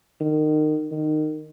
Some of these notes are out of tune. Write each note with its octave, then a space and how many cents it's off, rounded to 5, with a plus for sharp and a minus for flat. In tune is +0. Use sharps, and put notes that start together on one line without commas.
D#3 -25
D#3 -20